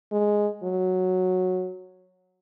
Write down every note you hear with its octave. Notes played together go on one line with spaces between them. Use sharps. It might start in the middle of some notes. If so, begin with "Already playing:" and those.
G#3
F#3